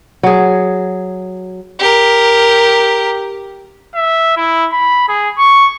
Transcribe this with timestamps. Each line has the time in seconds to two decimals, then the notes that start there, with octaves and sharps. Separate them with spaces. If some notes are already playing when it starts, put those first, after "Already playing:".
0.23 F#3 G#4
1.79 G4 A#4
3.95 E5
4.37 E4
4.72 B5
5.08 G#4
5.38 C#6